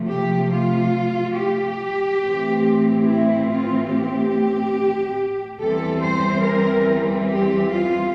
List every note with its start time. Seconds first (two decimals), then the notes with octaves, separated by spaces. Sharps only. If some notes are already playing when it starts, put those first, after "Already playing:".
Already playing: C3 F3 A3
0.11 G4
0.53 F4
1.38 G4
2.22 A2 E3 A3 C4
3.06 E4
3.49 F4
3.90 G4
5.59 E2 E3 G3 C4 A4
6.02 C5
6.44 A#4
7.29 G4
7.71 F4